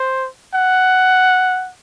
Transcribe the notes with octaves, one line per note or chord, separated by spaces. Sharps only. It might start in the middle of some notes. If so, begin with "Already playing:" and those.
Already playing: C5
F#5